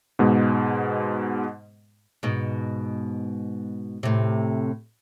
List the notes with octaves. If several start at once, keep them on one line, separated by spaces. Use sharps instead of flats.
G#2 B2 G#3
G#2 B2
A2 C3